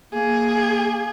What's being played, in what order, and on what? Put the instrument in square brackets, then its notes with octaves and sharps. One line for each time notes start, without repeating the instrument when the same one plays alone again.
[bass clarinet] A#3 [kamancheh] G#4